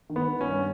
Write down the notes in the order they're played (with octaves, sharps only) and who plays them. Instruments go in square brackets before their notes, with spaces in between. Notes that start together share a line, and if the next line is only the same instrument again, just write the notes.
[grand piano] D#3
B3
D#3
C#4
G2